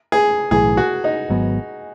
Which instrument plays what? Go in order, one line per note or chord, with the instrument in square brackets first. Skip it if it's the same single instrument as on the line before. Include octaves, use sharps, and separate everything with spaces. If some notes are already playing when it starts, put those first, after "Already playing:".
[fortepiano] G#4
[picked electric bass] B1 A2 E3 [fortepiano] G#4
[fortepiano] F#4
D#4
[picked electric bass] G#1 G#2 F#3 B3